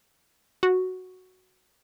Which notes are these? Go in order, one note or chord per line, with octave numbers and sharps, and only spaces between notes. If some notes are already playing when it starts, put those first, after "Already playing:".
F#4